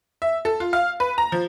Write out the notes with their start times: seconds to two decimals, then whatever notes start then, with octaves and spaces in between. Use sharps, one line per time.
0.22 E5
0.45 A4
0.60 F4
0.73 F5
1.00 B4
1.18 A#5
1.32 F3